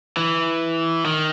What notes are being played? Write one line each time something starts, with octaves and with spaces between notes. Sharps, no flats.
E3
D#3